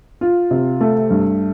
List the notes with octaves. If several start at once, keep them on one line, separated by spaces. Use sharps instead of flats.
F4
C3
A3
G2